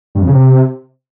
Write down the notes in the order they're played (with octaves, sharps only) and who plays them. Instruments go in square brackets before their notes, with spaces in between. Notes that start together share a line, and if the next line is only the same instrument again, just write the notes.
[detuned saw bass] G2
F2
C#3
C3